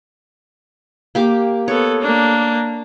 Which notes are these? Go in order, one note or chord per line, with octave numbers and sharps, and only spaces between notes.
A#3 G4 D6
B3 A4 C#5
A#3 D4